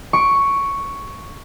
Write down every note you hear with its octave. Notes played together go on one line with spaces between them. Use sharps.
C#6 D7